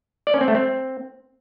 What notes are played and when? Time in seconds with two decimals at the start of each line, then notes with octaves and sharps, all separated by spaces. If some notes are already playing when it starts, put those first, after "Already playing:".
0.27 D5
0.34 C#4
0.41 C4
0.48 A3
0.55 C4